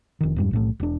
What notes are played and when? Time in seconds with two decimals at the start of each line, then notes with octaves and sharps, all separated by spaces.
0.21 F1 D#3
0.36 F2 G#2 G3
0.51 B1 A2 A3
0.80 E1 D4